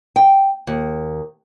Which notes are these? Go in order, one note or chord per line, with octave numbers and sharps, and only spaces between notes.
G5
D#2